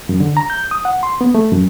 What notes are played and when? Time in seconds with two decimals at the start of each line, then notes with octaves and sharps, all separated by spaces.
0.09 F#2
0.20 D3
0.37 A#5
0.50 G6
0.71 D#6
0.85 F#5
1.03 C6
1.21 B3
1.35 A3
1.52 F#2